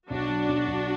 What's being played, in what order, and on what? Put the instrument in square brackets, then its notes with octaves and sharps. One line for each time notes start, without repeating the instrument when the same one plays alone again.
[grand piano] B1 [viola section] D4 F#4
[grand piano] F#3
B1
B1